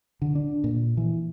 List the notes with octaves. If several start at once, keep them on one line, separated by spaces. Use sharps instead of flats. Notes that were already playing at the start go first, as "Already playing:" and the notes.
D3
D4
A#2
E3